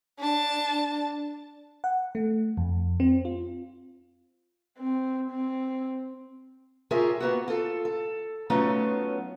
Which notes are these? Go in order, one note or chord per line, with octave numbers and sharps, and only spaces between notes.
D4 A5
F#5
A3
F2
C4
F4
C4
C4
F4 G4 G#4 A#4 C#5 E5
A#3 B3 F#4
F4 A4
A4
F#3 A3 B3 C#4 D#4 F4